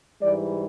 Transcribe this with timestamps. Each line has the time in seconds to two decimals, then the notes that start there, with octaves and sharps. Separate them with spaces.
0.22 G#2 E3 G3 D5